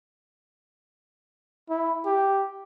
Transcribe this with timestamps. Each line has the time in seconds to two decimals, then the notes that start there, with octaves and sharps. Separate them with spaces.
1.70 E4
2.06 G4